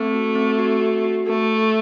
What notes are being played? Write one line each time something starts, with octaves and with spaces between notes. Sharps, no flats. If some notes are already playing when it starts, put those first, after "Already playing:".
Already playing: A3 C4
F#4
C4
F#4
F#4
F#4
A3 A4
A4